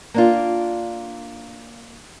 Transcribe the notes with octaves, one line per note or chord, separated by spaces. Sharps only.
A#3 D4 F4